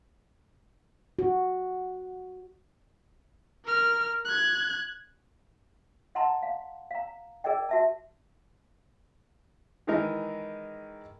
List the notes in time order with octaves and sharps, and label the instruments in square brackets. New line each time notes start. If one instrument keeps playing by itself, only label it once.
[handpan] F#4
[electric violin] A#4 F6
F#6 G#6
[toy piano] D#5 F#5 A5 A#5 C6
F5
F5 A#5
G#4 A#4 D5 D#5 G5
F#4 E5 A5
[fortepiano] D#3 E3 G#3 D#4 A#4